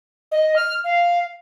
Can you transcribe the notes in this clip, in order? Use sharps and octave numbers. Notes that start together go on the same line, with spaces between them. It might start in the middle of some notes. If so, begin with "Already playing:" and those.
D#5
F6
F5